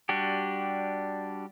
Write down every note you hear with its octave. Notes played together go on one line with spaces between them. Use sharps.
G3 D4 F#4 G4